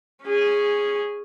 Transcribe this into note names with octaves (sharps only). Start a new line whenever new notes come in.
C#4 G#4